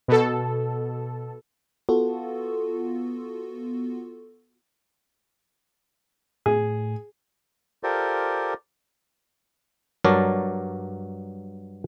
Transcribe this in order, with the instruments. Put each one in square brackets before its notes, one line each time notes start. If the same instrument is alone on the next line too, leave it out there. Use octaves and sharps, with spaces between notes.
[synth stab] B2 A4
[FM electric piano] B3 F4 F#4 A4
[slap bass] A2 A3 [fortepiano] G#4
[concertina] F4 G4 A4 A#4 C5 D5
[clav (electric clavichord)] G2 F#3 A#4 C#5 D5 A5